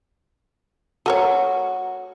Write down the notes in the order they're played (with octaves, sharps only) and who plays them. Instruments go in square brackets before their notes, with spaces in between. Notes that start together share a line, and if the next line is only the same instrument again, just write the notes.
[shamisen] A3 A#4 C#5 [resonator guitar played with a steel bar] F#4